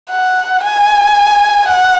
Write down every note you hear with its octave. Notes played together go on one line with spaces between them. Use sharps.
F#5
G#5
F#5